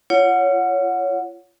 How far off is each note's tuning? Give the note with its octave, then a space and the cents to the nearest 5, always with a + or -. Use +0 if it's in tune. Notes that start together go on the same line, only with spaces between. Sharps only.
F4 -30 C#5 +15 F#5 -20